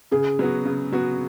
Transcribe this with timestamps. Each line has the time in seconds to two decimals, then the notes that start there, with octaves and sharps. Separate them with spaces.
0.12 C#3 G#4
0.39 F#3 B3 F#4
0.65 C#3
0.92 F#3 B3 F#4